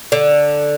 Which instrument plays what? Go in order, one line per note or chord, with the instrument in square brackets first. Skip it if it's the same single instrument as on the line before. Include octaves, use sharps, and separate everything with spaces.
[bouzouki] D3